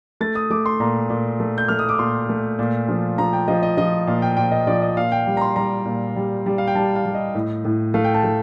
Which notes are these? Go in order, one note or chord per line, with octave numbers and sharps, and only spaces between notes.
A3 A6
D#6
A3 D6
C6
A#2 A#5
A#2
A3
G6
A3 F6
D#6
D6
A#2 C6
A3
A#2
F3
F3 A#5
G5
F3 D#5
D#5
F3 D#5
A#2 F5
G5
A#2 G5
D#5
F3 D5
D#5
A#2 F5
G5
G3
A#5
C6
G3 A#5
A#2
G3
G3
F5
G5
G3 A5
F5
G3
D#5
A2
A2
A3 F5
G5
A5
A3